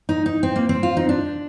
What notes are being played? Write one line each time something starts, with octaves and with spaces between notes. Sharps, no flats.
D#4
D#4
C4
A#3
C4
F4
D#4
D4